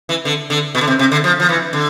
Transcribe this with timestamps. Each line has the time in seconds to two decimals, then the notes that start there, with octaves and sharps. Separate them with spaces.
0.09 E3
0.25 D3
0.50 D3
0.75 B2
0.81 D3
0.87 C3
0.99 C3
1.12 D3
1.24 F3
1.40 F3
1.49 E3
1.73 D3